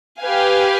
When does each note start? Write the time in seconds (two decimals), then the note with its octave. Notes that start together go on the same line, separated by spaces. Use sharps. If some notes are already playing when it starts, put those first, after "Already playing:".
0.22 G4 B4 F5 G#5